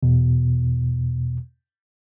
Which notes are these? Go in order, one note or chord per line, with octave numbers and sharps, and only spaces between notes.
E2 B2